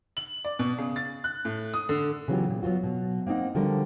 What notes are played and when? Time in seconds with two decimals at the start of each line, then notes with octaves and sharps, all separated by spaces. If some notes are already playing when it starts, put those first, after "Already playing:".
0.17 F#7
0.45 D5
0.59 B2
0.78 C#3
0.96 A6
1.24 F#6
1.45 A2
1.74 D#6
1.89 D3
2.28 C#3 E3 F#3 B3 F4 G4
2.49 A#2
2.63 F#3 B3 F4 F#4
2.84 B2 F#3
3.27 A#3 C4 D4 D#4 F#5
3.55 D3 F3 G3 F#4 G4 A#4